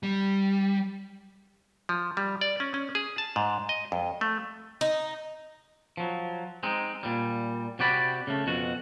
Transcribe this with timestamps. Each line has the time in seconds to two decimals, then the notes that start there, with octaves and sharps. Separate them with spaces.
0.03 G3
1.89 F3
2.17 G3
2.41 D5
2.60 C#4
2.74 C#4
2.95 G#4
3.18 A5
3.36 G#2
3.69 D#5
3.92 F2
4.21 A3
4.81 D#4
5.97 F3 F#3
6.63 G#3 C4 D#4
7.03 A#2 G3
7.79 C3 F#4 G4 D5 B5
8.27 C#3 A3
8.47 F2 B2 F#4